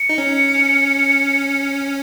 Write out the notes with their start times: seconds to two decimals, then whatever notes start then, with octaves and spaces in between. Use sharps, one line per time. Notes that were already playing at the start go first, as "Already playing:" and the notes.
Already playing: C#7
0.09 D#4
0.18 C#4